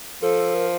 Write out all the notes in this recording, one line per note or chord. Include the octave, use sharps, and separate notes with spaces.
F3 A4
A#4